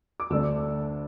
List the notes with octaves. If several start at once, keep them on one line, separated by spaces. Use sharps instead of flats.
D6
D2 D3 A3 D4 E6